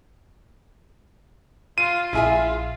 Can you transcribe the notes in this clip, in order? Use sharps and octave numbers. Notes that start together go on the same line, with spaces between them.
F4 D#7
A#1 E4 G#4 E5